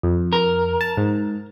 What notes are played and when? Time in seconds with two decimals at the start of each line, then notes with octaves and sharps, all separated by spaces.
0.03 F2
0.33 A#4
0.81 A5
0.97 G#2